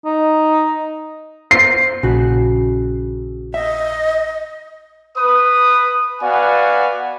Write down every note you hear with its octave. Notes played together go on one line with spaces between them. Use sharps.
D#4
C5 C7
A#1 C#3 F#4
D#5 E5
B4 D#6
B3 F#4 D5 F5 F#5 G#5